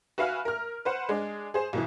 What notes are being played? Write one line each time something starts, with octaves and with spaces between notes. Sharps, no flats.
F#4 B4 E5 F5 G#5 F6
A#4 F6
B4 C5 F#5
G#3 D4
G#4 C5
B1 B2 E3